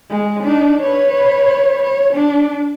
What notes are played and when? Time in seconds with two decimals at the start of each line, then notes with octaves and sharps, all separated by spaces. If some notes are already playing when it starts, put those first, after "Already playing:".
0.10 G#3
0.43 D4 D#4
0.80 B4 C#5
1.83 C#5
2.14 D4